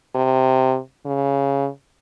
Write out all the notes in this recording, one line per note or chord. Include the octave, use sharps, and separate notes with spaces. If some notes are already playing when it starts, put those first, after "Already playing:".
C3
C#3